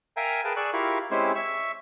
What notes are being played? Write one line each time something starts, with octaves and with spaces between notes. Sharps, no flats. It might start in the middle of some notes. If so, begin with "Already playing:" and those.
A#4 E5 F5 G5 G#5 A#5
G#4 A#4 B4 G5 A5
G#4 D5 C#6 E6 F#6
E4 F4 G4 A#4 F5 C#6
G#3 C4 C#4 E4 G4 C5
E5 C#6 E6